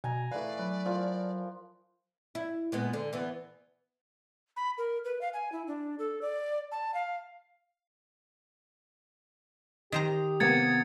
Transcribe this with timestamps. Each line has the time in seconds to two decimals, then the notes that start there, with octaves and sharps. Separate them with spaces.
0.04 B2 G#5 A#5
0.32 E3 A3 B4 D5 F5
0.59 F#3 B4
0.86 F3 A#4
2.35 E4
2.72 A#2 G#3 B3
2.93 D3
3.13 E3 B3
4.56 B5
4.78 A#4
5.05 B4
5.21 F5
5.33 G#5
5.52 E4
5.67 D4
5.99 A4
6.22 D5
6.72 A5
6.94 F5
9.92 D#3 G4 C5 A#5 D#6
10.40 C3 A#3 B3 G#6 A6 C#7